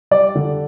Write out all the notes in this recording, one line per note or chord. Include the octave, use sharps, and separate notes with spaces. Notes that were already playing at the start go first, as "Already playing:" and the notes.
G3 D5
D3